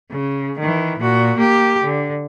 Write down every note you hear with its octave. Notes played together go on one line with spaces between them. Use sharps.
C#3
D#3 E3
A#2 F#4
A#3 G4
D3